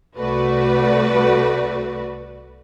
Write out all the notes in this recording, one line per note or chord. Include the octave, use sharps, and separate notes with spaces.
C2 A3 F#4 B4 D5